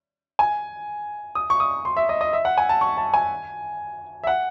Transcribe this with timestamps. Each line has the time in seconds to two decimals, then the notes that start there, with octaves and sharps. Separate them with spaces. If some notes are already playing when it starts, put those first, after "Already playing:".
0.39 G#5
1.35 D#6
1.50 C#6
1.60 D#6
1.85 C6
1.97 E5
2.09 D#5
2.21 D#5
2.33 E5
2.45 F#5
2.58 G#5
2.69 A5
2.81 C#6
2.97 A5
3.14 G#5
4.24 E5
4.27 F#5